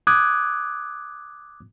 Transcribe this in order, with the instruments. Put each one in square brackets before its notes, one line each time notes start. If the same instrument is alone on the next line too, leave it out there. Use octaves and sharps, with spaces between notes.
[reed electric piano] D6 D#6 F#6 G#6